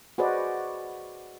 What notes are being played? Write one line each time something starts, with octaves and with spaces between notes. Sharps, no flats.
F#4 G#4 B4 C5 D5 D#5